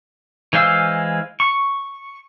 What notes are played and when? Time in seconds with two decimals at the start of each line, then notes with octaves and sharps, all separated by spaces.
0.53 E3 G#3 C5 F5 E6
1.40 C#6